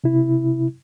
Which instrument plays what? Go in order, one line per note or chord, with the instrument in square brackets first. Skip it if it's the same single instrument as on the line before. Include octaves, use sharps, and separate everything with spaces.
[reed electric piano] C3 E4